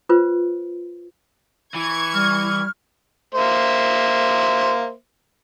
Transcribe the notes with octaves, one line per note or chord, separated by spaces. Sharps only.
F4 B4 C5
E3 C#6 G#6
G3 F6
A#3 C5 E5